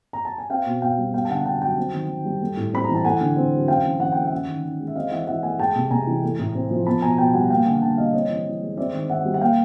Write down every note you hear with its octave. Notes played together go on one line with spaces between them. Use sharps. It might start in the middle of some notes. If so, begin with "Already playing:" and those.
A#5
A5
G#5
C4 F5 G5
B2
B2 F5 G5
G3
B3 F5 G5
A5
D3 F#5 G#5
D3 G5 A5
F#3 G5 A5
C4
D#3
D#3
G3
A3
A2
C4 B5
E3 A#5
A5
A3 F#5 G#5
D3
C4
F#3
C#4 F5 G5
E3
E3 F#5
A3 G5
E5 F#5
C#4
D#3
D#3
G#3
E5
C4 D#5 F5
E3 E5 F#5
E3 E5 F#5
A3 F#5 G#5
G#3 G5 A5
C3
C3 G#5 A#5
E3
A3
A2
C4
F3
B3 A5 B5
B2 G#5 A#5
B2 G5 A5
G3 F#5 G#5
A#3 F5 G5
D3 F#5 G#5
D3 G5 A5
G3 D#5 F5
C4 C#5 D#5
E3
E3
G#3
C4 D5 E5
D#3
D#3 E5 F#5
G3
F#5
A#3 F5 G5